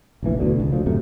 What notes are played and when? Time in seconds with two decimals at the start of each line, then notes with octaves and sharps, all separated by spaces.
0.23 F1 A#1 E3
0.39 E1 D2 B2 D3
0.60 C#2
0.72 D2 F3
0.86 D1 F#2 C3 A3